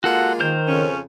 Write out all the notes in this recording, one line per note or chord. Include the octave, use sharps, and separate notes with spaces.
G#3 A#3 F4 F#4 A4 F#5
D#3 A#4 C5 G6
F2 C#3 C#4